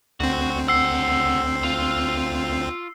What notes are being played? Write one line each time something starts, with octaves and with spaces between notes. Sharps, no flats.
D2 C4 F#4
C#3 F#5 E6 C7
F4